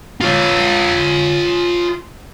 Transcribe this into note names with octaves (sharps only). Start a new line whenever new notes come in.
F4 C#5